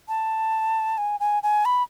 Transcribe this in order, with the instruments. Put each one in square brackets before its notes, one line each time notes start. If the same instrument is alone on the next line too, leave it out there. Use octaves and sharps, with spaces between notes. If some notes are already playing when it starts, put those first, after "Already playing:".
[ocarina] A5
G#5
G#5
G#5
B5